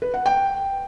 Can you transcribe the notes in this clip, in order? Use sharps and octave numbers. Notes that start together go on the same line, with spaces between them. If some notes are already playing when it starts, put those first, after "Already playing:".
B4
F#5
G5